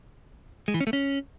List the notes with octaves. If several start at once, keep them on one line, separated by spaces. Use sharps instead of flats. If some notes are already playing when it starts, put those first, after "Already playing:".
G#3
E3
C#4
A3
C#4